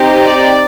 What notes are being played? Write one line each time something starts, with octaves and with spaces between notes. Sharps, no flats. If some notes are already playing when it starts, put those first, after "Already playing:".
Already playing: C4 D#4 G4
D5